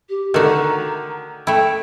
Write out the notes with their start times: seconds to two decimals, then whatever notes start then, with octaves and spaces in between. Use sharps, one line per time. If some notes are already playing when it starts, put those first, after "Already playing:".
0.09 G4
0.34 D3 D#3 A3 F#4 A#5
1.47 A3 E4 G5